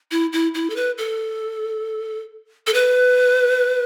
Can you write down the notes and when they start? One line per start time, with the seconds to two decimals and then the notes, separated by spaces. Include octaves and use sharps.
0.11 E4
0.33 E4
0.54 E4
0.70 A4
0.76 B4
0.98 A4
2.67 A4
2.74 B4